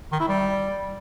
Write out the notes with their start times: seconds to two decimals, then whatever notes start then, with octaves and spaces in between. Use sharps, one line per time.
0.12 D#3
0.20 E4
0.28 G3